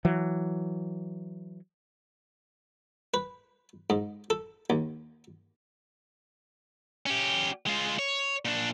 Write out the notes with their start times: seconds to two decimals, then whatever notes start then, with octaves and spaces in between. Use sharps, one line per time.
0.05 E3 F#3
3.14 B4
3.90 G#2
4.30 A4
4.70 D#2
7.06 C#4 G4
7.66 G#3 F4
7.99 C#5
8.45 A#2 D4